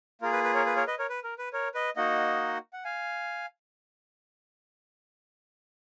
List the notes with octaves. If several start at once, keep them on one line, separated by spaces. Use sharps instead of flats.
A#3 F4 G#4 A#4
B4
B4
A#4 C#5
B4
A#4 C#5
B4 D#5
A#4 C#5
B4
A#4
B4
A#4 C#5
B4 D#5
A#3 D#4 F#4 D#5 F#5
F#5
F5 G#5